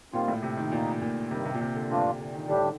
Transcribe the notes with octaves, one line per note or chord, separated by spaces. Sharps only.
A#2 D#3 G3 C4 F4
A2
C3
D#3
A#2 D#3 A#3 D#4
A#2
G2 C3 D#3 G3
C3
A#2
C3
D3
G2 C3 F3 A3 D4 F4
C3
D3
D#3
A2 D3 G3 D4 G4
D#3